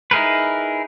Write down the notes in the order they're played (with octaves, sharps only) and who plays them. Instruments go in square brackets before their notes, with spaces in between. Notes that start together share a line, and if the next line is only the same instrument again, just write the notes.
[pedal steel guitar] D#4 E4 G#4 A#4 B4